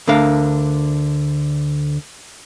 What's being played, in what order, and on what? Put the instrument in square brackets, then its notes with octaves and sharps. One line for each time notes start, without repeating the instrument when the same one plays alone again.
[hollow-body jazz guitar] D2 D3 D4 A#4 F5